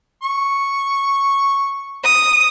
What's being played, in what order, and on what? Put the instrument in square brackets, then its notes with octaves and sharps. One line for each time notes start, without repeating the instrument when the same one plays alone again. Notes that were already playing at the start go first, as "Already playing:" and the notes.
[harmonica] C#6
[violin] D#6